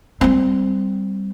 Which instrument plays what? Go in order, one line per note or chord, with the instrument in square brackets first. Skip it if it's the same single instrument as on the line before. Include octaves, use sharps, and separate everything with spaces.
[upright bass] G3 C4